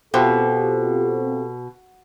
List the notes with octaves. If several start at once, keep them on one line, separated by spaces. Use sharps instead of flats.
B2 C4 F4 G4 A4